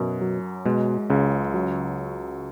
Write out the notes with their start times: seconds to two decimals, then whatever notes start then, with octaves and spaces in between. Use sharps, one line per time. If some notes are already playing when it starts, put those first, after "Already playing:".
Already playing: F#2 B2
0.21 F#3
0.66 B2 G#3
1.10 C#2 C#3
1.54 F#3